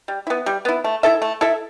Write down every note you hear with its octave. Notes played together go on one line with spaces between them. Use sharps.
G3
B3 E4
G3
B3 E4
A3
E4 A4 E5
A3
E4 A4 E5